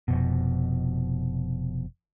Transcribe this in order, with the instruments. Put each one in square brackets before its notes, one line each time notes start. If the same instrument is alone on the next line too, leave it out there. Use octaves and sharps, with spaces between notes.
[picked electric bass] F1 F2 B2